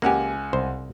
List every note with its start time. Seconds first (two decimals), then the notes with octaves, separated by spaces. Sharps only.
0.02 C#2 A#3 G4 F#5 G#5
0.53 C2 C5